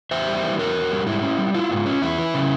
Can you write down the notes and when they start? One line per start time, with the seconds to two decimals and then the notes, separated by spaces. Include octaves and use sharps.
0.11 E2 C5 E5
0.27 G3
0.43 E3
0.59 E2 A#4 C#5
0.75 E2
0.91 G3
1.07 G#2 E4
1.22 C#4
1.38 G3
1.54 E4 F4
1.71 G#2
1.86 C#4
2.02 E2 E4
2.19 E3
2.34 C#3